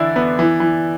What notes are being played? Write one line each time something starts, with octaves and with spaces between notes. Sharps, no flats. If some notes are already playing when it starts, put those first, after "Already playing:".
Already playing: D3 E3 E4 D5
B3
E3
E3